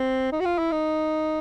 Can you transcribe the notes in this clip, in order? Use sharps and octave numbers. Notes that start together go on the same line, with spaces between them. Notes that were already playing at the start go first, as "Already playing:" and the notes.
Already playing: C4
D#4
F#4
F4
E4
D#4